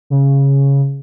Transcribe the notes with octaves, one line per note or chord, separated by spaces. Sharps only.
C#3